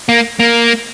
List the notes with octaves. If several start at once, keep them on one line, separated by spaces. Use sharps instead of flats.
A#3
A#3